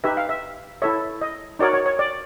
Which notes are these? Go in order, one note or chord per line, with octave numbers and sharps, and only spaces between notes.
D#4 G4 B4 E5
F5
E5
E4 A4 C#5 E5
D#5
D#4 F#4 A#4 C#5 D5
C#5
C#5
D5